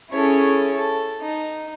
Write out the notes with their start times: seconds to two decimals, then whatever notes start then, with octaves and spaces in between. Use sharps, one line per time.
0.12 C#4 E4 G#4 A4 C#5
0.73 A4
1.22 D#4